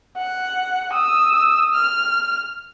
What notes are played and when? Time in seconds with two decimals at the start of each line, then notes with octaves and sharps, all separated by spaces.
0.17 F#5
0.93 D#6 E6
1.74 F6